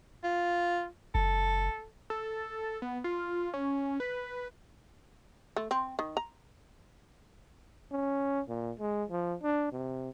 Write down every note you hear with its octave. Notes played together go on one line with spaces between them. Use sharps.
F4
F#1 A4
A4
B3
F4
C#4
B4
A3
C4
D#3
A#5
C#4
A#2
G#3
F3
D4
C3